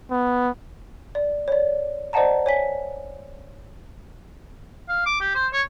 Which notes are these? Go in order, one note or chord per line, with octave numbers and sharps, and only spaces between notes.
B3
D5
C#5 D5
C5 D5 D#5 F#5 A5 A#5
C#5 G#5 B6
F5
D6
G4
C5
C#5